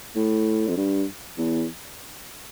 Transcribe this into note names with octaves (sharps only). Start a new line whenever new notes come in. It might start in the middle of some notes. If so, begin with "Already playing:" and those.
A2
F2
G2
E2